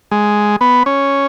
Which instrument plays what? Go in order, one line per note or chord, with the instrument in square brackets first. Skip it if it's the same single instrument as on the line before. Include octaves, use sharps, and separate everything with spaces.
[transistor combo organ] G#3
B3
C#4